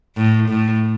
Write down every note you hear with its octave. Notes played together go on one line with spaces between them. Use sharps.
A2
A2